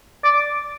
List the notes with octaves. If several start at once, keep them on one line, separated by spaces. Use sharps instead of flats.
D5